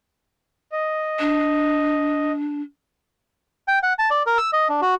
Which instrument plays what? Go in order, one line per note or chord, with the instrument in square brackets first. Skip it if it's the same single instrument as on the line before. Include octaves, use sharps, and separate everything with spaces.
[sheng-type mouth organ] D#5
[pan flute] D4
[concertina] G5
F#5
A5
D5
A#4
E6
D#5
D4
F#4